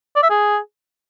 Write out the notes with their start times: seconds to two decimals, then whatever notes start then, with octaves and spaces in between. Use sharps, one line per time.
0.16 D5
0.23 E5
0.30 G#4